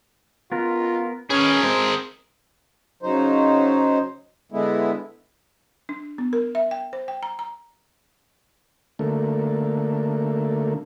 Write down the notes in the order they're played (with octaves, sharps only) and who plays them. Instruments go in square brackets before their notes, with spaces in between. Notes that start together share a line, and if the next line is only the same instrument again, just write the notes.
[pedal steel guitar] B3 A#4 [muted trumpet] F4
[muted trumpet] C#4 [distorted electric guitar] G#4 A#4 [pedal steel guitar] B4
[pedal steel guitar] G#3 C4 [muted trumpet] C5
[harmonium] C#3 F#3 D#4 C5
D3 G#3 B3 E4
[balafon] D4
B3
A#4
E5
G5
C5
G5
A#5
A#5
[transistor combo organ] D3 A3 A#3